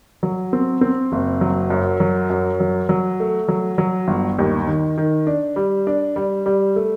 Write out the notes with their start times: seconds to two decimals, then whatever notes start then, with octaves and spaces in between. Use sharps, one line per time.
0.23 F#3
0.53 C4
0.81 C4
1.12 F#1
1.41 F#3
1.70 F#2
2.00 F#3
2.30 F#2
2.60 F#3
2.89 F#3
3.20 A3
3.48 F#3
3.78 F#3
4.08 G1
4.39 D#2
4.67 D#3
4.98 D#3
5.27 D4
5.56 G3
5.87 D4
6.16 G3
6.46 G3
6.76 A3